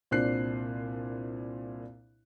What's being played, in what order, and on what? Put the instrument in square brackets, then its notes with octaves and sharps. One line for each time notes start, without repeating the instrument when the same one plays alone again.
[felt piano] C2 A#2 D4 C5 F#6 C7